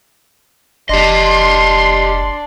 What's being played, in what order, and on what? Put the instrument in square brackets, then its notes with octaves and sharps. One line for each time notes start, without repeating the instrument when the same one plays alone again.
[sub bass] F1 [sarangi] D4 [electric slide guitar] G4 D#5 [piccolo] C6